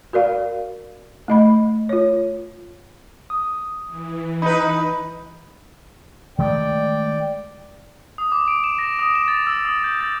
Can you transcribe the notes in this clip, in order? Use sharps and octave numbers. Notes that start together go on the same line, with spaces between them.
F#4 A#4 D5 F5
A3 D#5 B5
F4 C#5
D#6
E3
D#4 B4 B5
D#3 G#3 A3 D5 G5
D#6
D6
D7
E7
A#6
D#6
E7
A6
E6
D#6
G6
A6